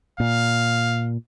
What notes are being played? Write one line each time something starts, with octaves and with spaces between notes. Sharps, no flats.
A#2 F5